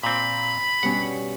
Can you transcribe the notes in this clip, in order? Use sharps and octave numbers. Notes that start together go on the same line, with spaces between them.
A#2 C4 B5
G2 B2 C#4 F#5